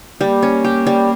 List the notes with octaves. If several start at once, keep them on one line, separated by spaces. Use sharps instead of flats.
G3 A#3
C#4
G4
G3